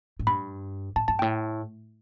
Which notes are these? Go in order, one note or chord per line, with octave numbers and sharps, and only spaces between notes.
A2
G2 B5
A2 A5
G2 A5
A2 G5